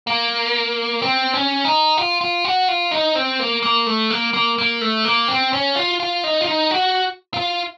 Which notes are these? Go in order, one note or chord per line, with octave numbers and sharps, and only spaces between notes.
A#3
C4
C#4
D#4
F4
F4
F#4
F4
D#4
C4
A#3
A#3
A3
A#3
A#3
A#3
A3
A#3
C4
C#4
F4
F4
D#4
F4
D#4
F#4
F4